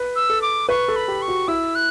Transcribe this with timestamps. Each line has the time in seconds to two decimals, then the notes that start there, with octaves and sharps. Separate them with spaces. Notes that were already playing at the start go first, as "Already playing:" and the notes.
Already playing: B4
0.16 E6
0.30 A4
0.42 D6
0.69 B4 C#6
0.88 A4
0.96 B5
1.08 G4
1.22 C#6
1.28 F#4
1.48 E4 E6
1.75 F#6